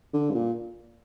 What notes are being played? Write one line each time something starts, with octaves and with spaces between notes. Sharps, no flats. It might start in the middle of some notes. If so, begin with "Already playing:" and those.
D3
G2
A#2